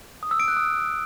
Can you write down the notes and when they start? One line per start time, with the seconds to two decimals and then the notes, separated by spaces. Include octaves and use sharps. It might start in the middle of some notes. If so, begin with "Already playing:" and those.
0.23 D#6
0.31 E6
0.40 D7
0.48 F#6
0.57 D#6